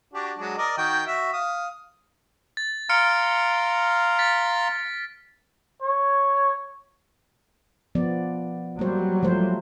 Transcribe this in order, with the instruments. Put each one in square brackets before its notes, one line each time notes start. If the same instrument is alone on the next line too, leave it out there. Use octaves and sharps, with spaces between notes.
[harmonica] D4 F#4 G4
F#3 G#3 D4
A#4 D5 D#5
D#3 F#4 G5
F#4 E5
F5 D#6
[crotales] A6
[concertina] F5 A#5 C6 [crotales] F6 C#7 D7
[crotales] A6 B6
[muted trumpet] C#5
[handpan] F3 B3 D5
[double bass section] F#3 G3 [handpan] A#3 C5
[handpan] F3 A3 C5